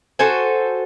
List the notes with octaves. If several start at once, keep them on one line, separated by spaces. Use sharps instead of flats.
F#4 A4 C5 G#5